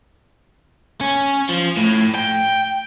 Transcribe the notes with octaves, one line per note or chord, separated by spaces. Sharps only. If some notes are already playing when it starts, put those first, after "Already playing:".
C#4
F3
A2
G5